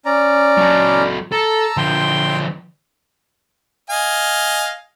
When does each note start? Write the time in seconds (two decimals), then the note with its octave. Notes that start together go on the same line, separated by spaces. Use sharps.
0.05 C#4 D5 A#5
0.58 F#3 A4
1.32 A4 A5 A#5 E6
1.77 D3 F3 G5 C6
3.90 D#5 F5 G#5